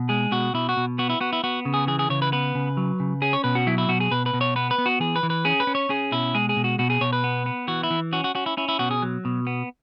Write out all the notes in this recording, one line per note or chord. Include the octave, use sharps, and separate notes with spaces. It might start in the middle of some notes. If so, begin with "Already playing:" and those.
Already playing: B2
G#3 G#4
B2 F#4
B2 E4
F#4
B2
B3 F#4
E4
B3 F#4
E4
B3 F#4
C#3
G#4
E3 G#4
G#4
C#3 C#5
B4
B3 B4
C#3
F#3
C#3
C#4 G#4
C#5
B2 B4
F#4
F#3 E4
E4
B2 F#4
G#4
B2 B4
B4
B2
C#5
B3 B4
B4
B3
F#4
E3 G#4
B4
E3
B4
C#4 G#4
B4
C#4
C#5
C#4 G#4
B2 E4
G#3 G#4
G#4
B2
F#4
B2 F#4
G#4
B2 C#5
B4
B3
B3
E3 F#4
E4
E3
C#4 F#4
F#4
C#4 F#4
E4
C#4 E4
E4
B2 F#4
G#4
F#3
B2
B3